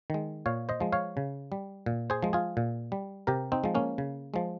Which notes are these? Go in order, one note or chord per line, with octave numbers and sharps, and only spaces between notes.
D#3 G#3
A#2 C#5 F5
C5 D#5
F3 G#3
C#5 F5
C#3
G3
A#2
G#4 C5
F3 G#3
F4 G#4
A#2
G3
C3 G4 A#4
C4 D#4
F3 G#3
A#3 C#4
C#3
F3 G#3